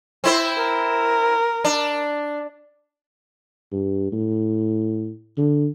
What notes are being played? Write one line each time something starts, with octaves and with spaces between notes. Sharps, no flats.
C4 E4 C5
A#4
D4
G2
A2
D3